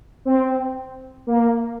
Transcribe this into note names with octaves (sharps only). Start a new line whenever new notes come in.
C4
A#3